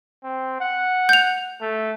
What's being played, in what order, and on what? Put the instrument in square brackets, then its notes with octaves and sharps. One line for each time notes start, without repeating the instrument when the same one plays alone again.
[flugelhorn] C4
F#5
[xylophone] G6 F7
[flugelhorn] A3